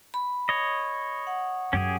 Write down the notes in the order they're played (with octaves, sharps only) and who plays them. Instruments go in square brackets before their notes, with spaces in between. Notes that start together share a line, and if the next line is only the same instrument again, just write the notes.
[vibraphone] B5
[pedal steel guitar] C#5 D#5
[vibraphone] F#5
[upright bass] F#2 [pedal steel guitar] C#4 G4 G#4